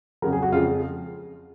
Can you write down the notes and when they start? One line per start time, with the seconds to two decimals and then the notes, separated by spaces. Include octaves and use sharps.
0.22 F2 C#3 F#3 A#4
0.32 G#4
0.42 F#4
0.52 F2 C#3 G#3 F4